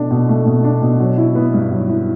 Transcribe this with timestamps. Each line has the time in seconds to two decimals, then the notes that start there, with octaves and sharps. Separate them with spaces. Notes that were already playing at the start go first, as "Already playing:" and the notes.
Already playing: B2 A3 D4
0.11 B2
0.29 A3
0.46 B2
0.64 D4
0.82 B2
1.00 F#3
1.18 E4
1.35 B3
1.53 G2
1.71 F#3
1.89 E4